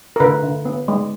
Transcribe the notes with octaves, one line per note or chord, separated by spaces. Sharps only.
A#4
D3 B4
D3
B3
G#3